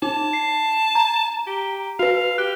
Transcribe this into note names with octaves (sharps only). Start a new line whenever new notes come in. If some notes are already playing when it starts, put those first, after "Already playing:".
D#4 A5
C7
A#5
G4
F#4 B4 F5
G4 F#6